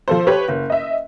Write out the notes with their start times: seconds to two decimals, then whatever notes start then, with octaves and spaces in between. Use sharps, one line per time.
0.08 F3 A4 C5
0.27 G4 B4 C#5
0.48 F#1
0.70 D#5 E5